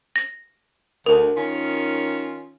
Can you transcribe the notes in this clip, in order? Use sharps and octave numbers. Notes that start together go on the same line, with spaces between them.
A#6
D2 A#4
D#3 C#4 F4